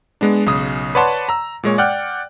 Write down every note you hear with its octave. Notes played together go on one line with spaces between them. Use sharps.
G#3 B3 D4
B1 C#3 D#6
B4 C#5 D5 F#5 A5 C6
A#5 E6
A#2 G#3 C#5
D5 F#5 G5 F6 F#6